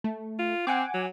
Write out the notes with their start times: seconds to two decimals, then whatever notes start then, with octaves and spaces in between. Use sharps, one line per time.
0.04 A3
0.39 F4
0.67 C4 F#5 G#5 D6
0.94 F#3